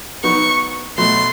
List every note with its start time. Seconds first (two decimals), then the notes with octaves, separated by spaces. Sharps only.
0.23 F#3 B3 D#4 C#6
0.98 B2 F#3 A3 C6